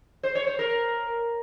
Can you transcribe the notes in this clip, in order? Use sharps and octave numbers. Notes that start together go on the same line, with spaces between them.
C5
C#5
C5
A#4